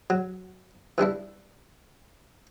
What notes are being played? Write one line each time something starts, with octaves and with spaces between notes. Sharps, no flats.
F#3
E3 G3 D4 E4